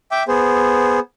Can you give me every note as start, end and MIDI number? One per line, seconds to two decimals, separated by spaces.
0.11 0.23 76
0.11 0.23 79
0.11 0.23 86
0.28 1.00 59
0.28 1.00 68
0.28 1.00 72